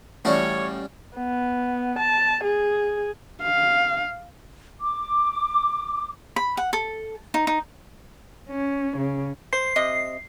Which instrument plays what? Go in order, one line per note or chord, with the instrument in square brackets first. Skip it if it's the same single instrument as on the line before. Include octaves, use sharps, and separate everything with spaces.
[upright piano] A1 D5 [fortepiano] A2 [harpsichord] G3 C#4 F#4 [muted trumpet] C#5
[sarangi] B3
A5
G#4
[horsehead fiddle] F5
[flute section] D6
[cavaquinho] B5
F#5
A4
D#4
D#4
[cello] C#4
C#3
[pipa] C5 [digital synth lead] C7
[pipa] C3 D#5